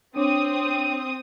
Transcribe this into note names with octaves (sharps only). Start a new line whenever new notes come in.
C4 D4 C#5 D6 D#6